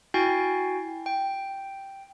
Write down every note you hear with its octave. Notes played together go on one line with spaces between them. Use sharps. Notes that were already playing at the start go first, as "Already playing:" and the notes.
E4 F#4 G5 G#5 A6
G5